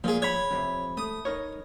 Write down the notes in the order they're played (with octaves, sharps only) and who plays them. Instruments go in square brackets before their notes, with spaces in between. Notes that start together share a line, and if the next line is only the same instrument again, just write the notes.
[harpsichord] A#2 G#4 [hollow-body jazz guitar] F3 G#5
[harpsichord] C#5 [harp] B5 G#6
[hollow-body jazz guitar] F2 A2 C3
[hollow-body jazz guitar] A3 [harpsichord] D#6
[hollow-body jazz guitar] D#4 A#4 C#5